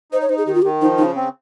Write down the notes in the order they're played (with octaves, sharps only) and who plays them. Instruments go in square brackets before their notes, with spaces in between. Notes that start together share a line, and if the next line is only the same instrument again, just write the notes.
[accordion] D#4 [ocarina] C5
[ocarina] C#5
[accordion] D#4 [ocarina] C5
[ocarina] G#4
[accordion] D#3 [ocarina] G4
[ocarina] F4
[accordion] D#3 [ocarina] G4
[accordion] F3 [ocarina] D#4
[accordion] C#3 [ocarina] D#4
[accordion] C4